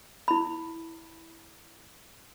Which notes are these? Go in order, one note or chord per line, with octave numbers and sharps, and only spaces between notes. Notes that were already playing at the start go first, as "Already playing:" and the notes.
E4 B5